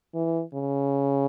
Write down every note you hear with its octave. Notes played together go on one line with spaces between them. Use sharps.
E3
C#3